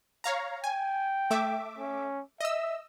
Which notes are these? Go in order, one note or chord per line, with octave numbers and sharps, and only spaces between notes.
C#5 F5 A#5
G5 G#5
A3 E5 D6
C#4
D#5 E5 E6